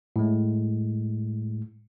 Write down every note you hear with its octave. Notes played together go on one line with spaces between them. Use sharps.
A2 G#3